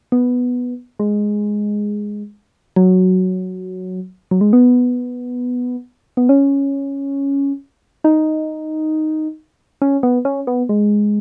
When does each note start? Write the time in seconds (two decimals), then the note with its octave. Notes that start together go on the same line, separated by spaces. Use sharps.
0.12 B3
1.00 G#3
2.76 F#3
4.31 F#3
4.41 G#3
4.53 B3
6.17 B3
6.29 C#4
8.04 D#4
9.82 C#4
10.03 B3
10.25 C#4
10.47 B3
10.69 G#3